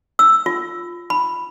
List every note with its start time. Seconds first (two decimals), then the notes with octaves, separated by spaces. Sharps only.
0.19 E6
0.46 F4
1.10 B5